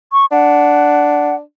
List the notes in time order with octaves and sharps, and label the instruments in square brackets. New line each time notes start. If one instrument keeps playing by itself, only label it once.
[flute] C#6
[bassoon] D4 [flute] F#5